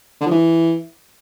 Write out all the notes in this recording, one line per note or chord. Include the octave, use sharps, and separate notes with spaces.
D3
F3
E3